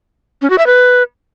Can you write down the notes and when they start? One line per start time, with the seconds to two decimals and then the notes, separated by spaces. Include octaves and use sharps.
0.42 C#4
0.50 F#4
0.58 E5
0.67 B4